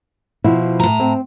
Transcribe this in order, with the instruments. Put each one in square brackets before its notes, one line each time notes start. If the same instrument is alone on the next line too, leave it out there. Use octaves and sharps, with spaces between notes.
[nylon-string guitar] B2 F3 E4
[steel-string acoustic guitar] A2 A#5
[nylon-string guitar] C4